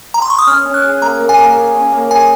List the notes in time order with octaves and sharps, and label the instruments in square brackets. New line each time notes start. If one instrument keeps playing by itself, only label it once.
[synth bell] A#5
C6
C#6
D#6
[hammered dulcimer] C#4 [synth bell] F6
[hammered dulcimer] C#4
[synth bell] F#6
[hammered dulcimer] G#4
[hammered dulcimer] A#3 [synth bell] A#5
[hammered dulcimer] A#3
[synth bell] G#5
[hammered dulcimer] A#3
G#4
C#4
A#3
[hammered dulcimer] G#4 [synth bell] G#5